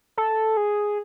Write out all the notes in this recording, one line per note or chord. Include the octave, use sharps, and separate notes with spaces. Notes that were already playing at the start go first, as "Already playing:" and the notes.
A4
G#4